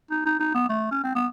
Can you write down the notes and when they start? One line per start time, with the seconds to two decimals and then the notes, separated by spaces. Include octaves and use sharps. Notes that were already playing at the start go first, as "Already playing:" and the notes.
0.11 D#4
0.26 D#4
0.40 D#4
0.54 B3
0.69 A3
0.91 C#4
1.04 C4
1.15 B3